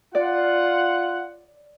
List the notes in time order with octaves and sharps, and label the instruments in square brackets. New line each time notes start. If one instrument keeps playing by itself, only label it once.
[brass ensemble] F4 F#5 [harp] D5